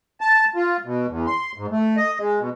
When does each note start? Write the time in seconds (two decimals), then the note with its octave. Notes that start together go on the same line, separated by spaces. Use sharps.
0.21 A5
0.56 F4
0.85 B2
1.09 E2
1.27 C6
1.58 G#2
1.71 A3
1.97 D#5
2.19 G#3
2.40 B2